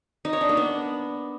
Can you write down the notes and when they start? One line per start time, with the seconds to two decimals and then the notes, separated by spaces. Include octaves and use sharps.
0.25 D#4
0.33 C#5
0.41 D4
0.49 A#3
0.57 B3